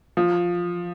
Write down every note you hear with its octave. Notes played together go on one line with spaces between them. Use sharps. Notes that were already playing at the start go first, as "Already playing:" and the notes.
F3